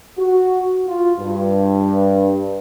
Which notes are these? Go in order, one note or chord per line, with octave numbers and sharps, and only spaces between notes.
F#4
F4
G2